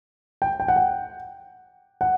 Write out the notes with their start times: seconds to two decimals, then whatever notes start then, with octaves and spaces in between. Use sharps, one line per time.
0.42 G5
0.60 G5
0.68 F#5
0.76 G5
2.01 F#5